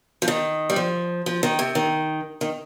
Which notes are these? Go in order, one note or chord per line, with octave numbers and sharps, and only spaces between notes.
F3
D#3
G3
F3
F3
D#3
C3
D#3
D#3